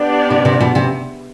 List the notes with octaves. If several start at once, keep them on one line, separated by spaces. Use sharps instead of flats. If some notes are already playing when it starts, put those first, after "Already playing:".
Already playing: B3 D4 G4 D5
C3
C3
B2
C3